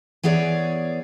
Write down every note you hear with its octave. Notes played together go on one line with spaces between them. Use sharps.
E3 B3 G#4 C#5 D5